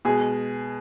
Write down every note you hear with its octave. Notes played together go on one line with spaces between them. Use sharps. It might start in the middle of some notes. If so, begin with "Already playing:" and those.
B2 G#3 G#4